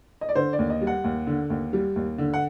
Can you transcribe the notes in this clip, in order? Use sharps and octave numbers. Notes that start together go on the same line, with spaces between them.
D#5
D5
D3 C5
D5
D#2
D#5
G3
F#5
D#2
D3
D#2
G3
D#2
D3
F#5